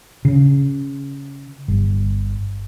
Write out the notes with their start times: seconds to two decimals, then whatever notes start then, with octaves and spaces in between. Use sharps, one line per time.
0.25 C#3
1.68 G1